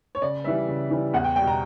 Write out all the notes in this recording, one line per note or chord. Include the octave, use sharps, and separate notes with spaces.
C#5
C#3 D5
E3 G3 E5
C#3
E3 G3
E2 F#5
G5
B2 G3 G5
A#5